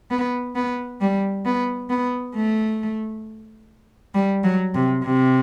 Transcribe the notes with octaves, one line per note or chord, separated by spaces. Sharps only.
B3
B3
G3
B3
B3
A3
G3
F#3
C3
C3